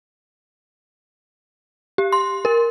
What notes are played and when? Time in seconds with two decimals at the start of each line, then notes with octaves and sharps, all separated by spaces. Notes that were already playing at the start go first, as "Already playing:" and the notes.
1.98 G4
2.12 C6
2.45 A#4